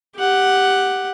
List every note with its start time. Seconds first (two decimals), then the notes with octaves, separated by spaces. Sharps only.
0.16 G4 F#5